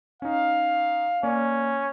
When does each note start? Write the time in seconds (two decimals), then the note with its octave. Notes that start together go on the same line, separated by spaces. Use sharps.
0.22 C#4 D#4 F5
1.23 A#3 C#4 D5